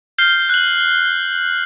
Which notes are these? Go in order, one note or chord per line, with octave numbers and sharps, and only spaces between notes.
F6 G6 C7 G7
F#6 F#7